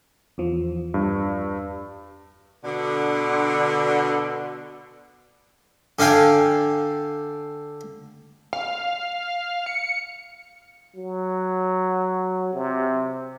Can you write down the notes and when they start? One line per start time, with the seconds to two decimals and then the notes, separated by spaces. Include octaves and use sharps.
0.38 E2 F3
0.94 G2
2.65 B2 D3
5.99 D3 D4 F5 G5 G#5
8.53 F5
9.66 C#7
10.96 F#3
12.53 C3